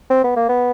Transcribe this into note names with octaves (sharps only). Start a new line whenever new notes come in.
C4
B3
A#3
B3